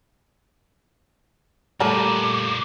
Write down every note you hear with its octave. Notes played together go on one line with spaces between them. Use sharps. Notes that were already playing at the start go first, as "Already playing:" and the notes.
A#2 G3 A3 A#4 B4 A5 A#5 D6